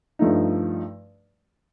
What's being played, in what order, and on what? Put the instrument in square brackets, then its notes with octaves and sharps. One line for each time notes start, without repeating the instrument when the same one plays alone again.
[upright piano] G2 F3 A3 D#4